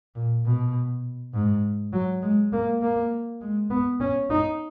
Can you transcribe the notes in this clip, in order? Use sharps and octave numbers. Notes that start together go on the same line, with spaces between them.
A#2
B2
G#2
F#3
G#3
A#3
A#3
G#3
B3
C#4
D#4